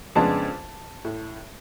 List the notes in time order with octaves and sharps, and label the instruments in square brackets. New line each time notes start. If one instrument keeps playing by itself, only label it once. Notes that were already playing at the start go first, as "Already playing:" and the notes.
[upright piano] F2 C#3 G#3 B3 D4 A5
A2